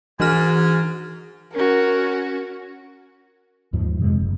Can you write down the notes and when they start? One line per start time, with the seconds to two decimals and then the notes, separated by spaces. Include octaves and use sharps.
0.20 G#2 E3 F#4 F6
1.54 C#4 F#4 A#4
3.73 D#2 G#2 F3
4.00 F2 C3 G#3
4.20 F#1